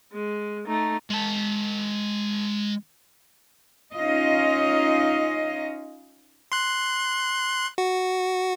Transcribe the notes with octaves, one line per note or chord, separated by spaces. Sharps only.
G#3
A3 D#4
G#3 A5
C#4 D#4 F4 D#5
C6 F#6
F#4